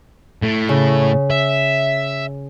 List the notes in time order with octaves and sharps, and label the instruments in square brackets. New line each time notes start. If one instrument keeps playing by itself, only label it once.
[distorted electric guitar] A2
[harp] C#3
[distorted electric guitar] E5